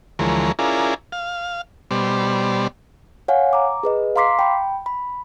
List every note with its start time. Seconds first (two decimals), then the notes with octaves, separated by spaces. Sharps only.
0.19 D2 E3 F3 G#3 A#4 C#5
0.59 C#4 E4 F4 G#4 A#4 D5
1.12 F5
1.91 B2 G3 C5 D5
3.28 C#5 F5 F#5 G#5
3.53 A#5 D6
3.83 G#4 B4 D#5
4.16 F5 A#5 C6 D6 B6 C7
4.39 G5 B5
4.86 B5